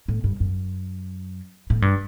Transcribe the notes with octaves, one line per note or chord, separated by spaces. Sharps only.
A2
G2
F#2
A2
G2